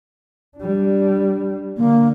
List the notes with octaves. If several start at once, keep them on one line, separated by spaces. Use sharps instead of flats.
G3 D4
D3 A#3